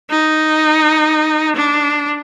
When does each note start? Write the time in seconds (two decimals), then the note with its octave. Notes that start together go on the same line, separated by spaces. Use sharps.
0.10 D#4
1.56 D4